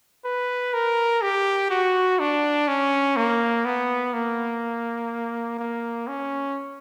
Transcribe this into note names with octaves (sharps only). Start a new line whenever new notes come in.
B4
A#4
G4
F#4
D4
C#4
A#3
B3
A#3
A#3
C#4